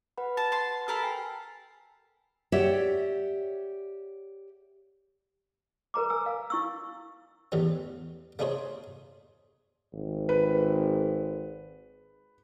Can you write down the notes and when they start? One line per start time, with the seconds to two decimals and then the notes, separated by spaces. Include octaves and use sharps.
0.17 B4 F#5 B5
0.37 A5
0.52 A5 C6
0.88 A4 A#4 B5
1.03 G5 G#5 C7
2.52 G4 C#5 D5 E5 F#5 G5
5.94 A#4 B4 A#5 D6
6.10 G#5 E6
6.26 F5
6.50 E4 C#6 E6
7.52 E2 A2 E3 G3 C#4
8.39 A3 D4 D#4 G#4 C5 C#5
9.93 G#1
10.29 B4